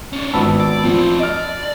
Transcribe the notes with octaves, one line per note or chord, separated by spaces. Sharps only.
C#4 D4
G#1 B3 A5 B5 E6
D5
A2 F3 C4
D5 D#5 F6